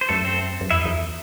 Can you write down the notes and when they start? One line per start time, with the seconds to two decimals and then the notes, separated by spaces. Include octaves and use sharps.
0.01 C5
0.09 F#2 A3 A4
0.25 C4 C5
0.61 F#2
0.70 E2 E4 E5
0.81 D#4 D#5
0.85 E2